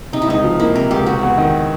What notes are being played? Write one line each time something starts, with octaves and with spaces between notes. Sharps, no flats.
C3 D#4
E4
C#2 D#4
F3
A#3 E4
C3 A#4
C#2 G4
C3 F#4
E2
D#3